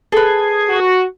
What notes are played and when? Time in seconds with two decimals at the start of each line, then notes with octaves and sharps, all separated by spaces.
0.12 G#4 A4 B4
0.69 F#4